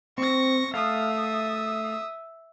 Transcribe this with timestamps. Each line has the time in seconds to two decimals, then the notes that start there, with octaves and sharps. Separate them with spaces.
0.18 C4 C#6 A#6
0.74 A3 E5 F5 D#6